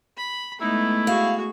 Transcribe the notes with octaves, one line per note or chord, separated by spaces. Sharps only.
B5
G#3 A3 B3 D#4 E4
F#4 G#4 F5